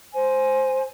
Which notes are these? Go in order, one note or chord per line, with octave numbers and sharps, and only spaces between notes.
C5 G#5